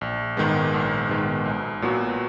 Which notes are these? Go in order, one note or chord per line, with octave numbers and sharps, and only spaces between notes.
A#1
G#2 D#3 G#3 B3
A#1
G#2 D#3 G#3 B3
B1
A#2 F#3 B3 F#4